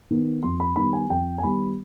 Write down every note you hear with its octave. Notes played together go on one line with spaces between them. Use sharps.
D#3 B3
F2 C6
B5
D#3 G3 B3 B5
G#5
F2 G5
G#5
D#3 G3 B3 B5